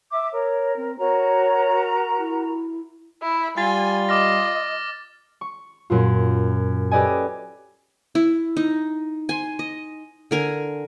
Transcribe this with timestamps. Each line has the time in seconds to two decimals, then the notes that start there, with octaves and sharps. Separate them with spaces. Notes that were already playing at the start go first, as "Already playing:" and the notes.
0.10 E5 D6
0.32 A#4 C#5
0.76 C4
0.99 F#4 A#4 C#5 A#5
2.18 E4
3.22 E4
3.58 G3 F4 G#5 A6
4.09 D#5 D6 F6 A#6
5.41 C#6
5.90 F#2 A#2 F4
6.91 G4 A4 B4 D5 D#5 G#5
8.15 E4
8.57 D#4
9.29 G#5 C6
9.59 D#5
10.31 D3 A#4 G#5